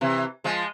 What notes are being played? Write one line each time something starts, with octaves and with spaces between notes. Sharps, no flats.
C3 E3
F3 G#3